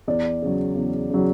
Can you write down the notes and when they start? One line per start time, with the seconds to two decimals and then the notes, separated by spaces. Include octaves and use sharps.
0.07 E2 D5
0.42 C#3 F#3
0.75 E2
1.11 C#3 F#3